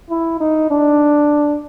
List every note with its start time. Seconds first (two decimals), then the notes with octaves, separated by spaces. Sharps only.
0.10 E4
0.40 D#4
0.71 D4